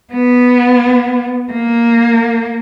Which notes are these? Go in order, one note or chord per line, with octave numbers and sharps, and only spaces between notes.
B3
A#3